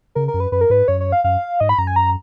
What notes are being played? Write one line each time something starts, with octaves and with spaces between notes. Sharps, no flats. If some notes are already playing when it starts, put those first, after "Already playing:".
C#3 A#4
A#4
F#2
B4
F#2 B4
A#4
G#2 B4
F#2 C#5
C#5
F5
F#2 F5
G#2 D#5
B5
F#2 A#5
G#5
A#5